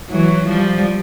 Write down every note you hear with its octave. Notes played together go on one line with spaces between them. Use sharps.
E3 F#3
F3 G3